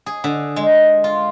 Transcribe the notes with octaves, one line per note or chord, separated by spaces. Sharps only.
G#4
D3
G#3
F4